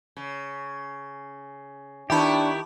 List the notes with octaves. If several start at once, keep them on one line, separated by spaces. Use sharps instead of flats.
C#3
D#3 B3 D4 E4 G4 E5 A5 B5